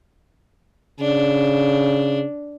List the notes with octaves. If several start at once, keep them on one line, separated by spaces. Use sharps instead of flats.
C#3 D4